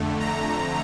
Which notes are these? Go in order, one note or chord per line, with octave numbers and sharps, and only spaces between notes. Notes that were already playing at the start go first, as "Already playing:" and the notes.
Already playing: F2 D3 A3
A#5